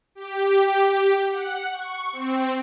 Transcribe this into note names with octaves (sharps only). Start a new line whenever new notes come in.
G4
F#5
C#6
C4